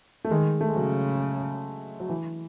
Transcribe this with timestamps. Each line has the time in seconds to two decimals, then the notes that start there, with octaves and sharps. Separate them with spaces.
0.25 A3
0.30 D#3 G#3
0.61 A3
0.68 G#3
0.76 C#3 F#3
2.00 F#3
2.09 E3